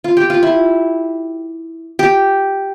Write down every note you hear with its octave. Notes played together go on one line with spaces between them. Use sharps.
F4
G4
F4
E4
G4